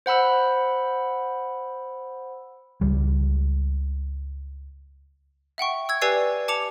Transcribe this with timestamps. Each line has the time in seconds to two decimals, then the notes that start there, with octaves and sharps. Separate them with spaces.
0.06 C5 F#5 B5 E6
2.81 C#2 G3
5.58 E5 F#5 G5 C#6
5.89 E6 G#6
6.02 G4 B4 D5 G#5 E6 C7
6.48 A5 D6 C#7 F7